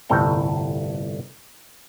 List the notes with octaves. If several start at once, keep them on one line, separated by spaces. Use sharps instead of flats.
G1 C2 A2 A4 G5 A#5